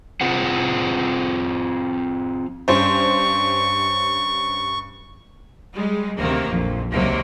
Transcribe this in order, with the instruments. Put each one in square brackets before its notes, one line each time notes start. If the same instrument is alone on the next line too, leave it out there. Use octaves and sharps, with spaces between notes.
[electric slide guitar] C4 F4 G#4 C5 F#5
[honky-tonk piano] G2 C#4 C5 [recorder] C#6
[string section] G3 G#3
D2 C3 D#3 F#3 A#3
A#1 F2
C#2 C3 D#3 F#3 A#3